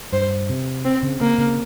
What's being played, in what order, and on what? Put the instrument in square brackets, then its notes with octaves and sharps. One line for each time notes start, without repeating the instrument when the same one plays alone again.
[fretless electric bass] G2 [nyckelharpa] C5
[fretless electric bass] C3
[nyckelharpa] C4
[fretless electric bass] C#3
[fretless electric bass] C#3 [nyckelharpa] A#3
[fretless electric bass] C#3